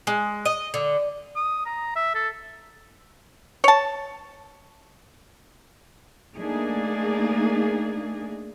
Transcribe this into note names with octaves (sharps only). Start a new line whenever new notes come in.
G#3
D#5
D3
D#6
A#5
E5
A4
C#5 A5
A3 A#3 D4 D#4 G#4